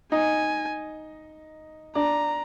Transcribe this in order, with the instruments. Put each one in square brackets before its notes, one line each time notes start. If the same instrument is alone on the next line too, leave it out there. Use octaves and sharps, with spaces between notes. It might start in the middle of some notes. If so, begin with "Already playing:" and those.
[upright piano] D#4 D#5 [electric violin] G#5
[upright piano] D4 D5 [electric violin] A#5